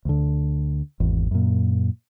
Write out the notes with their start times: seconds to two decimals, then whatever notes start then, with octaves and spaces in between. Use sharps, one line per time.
0.05 D2 D3
1.00 G#1 E2
1.31 F#2 A#2